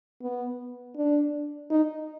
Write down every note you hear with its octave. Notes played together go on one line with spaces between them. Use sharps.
B3
D4
D#4